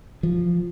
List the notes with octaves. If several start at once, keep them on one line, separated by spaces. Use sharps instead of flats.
F3